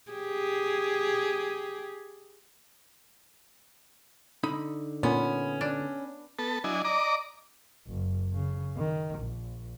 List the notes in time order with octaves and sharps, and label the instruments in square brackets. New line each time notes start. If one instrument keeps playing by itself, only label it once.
[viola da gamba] G4 G#4
[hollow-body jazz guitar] D3 D#4 B5
[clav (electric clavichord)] A#2 [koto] B3 [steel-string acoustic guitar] C#4
[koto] D4
[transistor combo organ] B3 A4 A5
F#3 D4 E4 D#5 G#5
D5 D#5 A#5 D6
[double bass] F#1
C#3
D#3
A#1